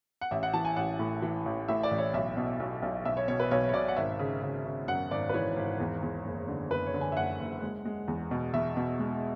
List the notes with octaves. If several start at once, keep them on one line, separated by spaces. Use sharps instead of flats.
F#5
A1 E5
F#5
E3 A5
G#5
A1 F#5
A2
E3
A1
A2 E5
D5
A1
C#5
B1 E5
B2
B1
B1
B1 E5
C#5
B2 C#5
B4
B1 C#5
C#5
B2 D5
F#5
G#1 E5
C#3
C#3
C#3
F#2 F#5
G#1 D5
B4
E3 C#5
G#1
E2
E2
F#1
D3
F#1 B4
C#5
D3
G#5
E5
F#1 F#5
F#1
G#3
G#3
E2
B2
E2 E5
B2
G#3